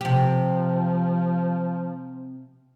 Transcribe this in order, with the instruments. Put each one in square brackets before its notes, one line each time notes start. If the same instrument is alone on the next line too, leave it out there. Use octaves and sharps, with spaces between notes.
[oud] C3 G4 [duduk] F3